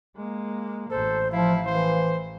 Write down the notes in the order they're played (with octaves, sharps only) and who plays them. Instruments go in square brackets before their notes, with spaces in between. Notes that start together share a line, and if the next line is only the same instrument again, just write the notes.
[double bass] G#3 A#3
[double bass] A1 [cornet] A4 [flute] C5
[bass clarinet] F3 [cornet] E4 [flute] F5
[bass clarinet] E3 [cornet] C5